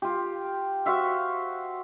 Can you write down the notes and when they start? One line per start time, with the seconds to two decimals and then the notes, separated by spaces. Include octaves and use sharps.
0.02 F4 G4
0.86 F#4 C5 E5 F5